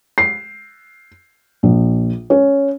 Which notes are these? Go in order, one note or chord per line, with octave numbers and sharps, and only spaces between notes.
C7
A#1
C#4